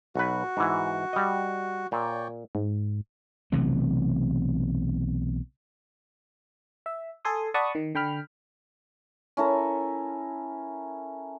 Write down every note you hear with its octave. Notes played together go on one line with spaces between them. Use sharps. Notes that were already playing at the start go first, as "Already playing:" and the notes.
B1 F#4 B4
G#2 E3
G3 D#5
A#2 C#5 D5 G5
G#2
B1 C3 E3 A3
E5
A4 G#5 C6 D#6
D5 F#5 A5 B5 C#6 D#6
D#3
D3 G5 B5 F6
C#4 E4 A4 A#4